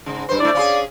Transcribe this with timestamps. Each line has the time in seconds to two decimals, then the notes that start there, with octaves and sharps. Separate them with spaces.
0.06 G#2 C#3
0.29 G2 B4 C5
0.40 A3 D4 E4 D5
0.55 C#4 E4 G#4 F5